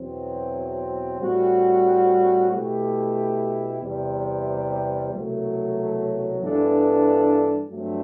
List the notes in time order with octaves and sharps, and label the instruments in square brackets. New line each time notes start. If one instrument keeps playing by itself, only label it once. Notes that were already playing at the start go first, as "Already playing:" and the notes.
Already playing: [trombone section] E2 B2 F#3 C4
A2 G3 C4 F#4
B2 A3 E4 G4
E2 C3 G3
C2 B2 F#3 A3
G2 E3 B3 D4 A4
G2 F#3 A3 C4